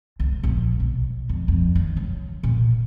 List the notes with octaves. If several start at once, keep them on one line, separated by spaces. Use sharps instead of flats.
C#2
A#1
B1
F2
F2
D#3
F#2
A#2